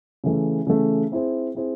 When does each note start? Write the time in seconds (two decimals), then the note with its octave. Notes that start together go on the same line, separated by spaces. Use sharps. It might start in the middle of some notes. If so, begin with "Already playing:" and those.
0.24 C#3 E3 A3
0.67 C#3 E3 A3
1.12 C4 E4 G#4 C5
1.55 C4 E4 G#4 C5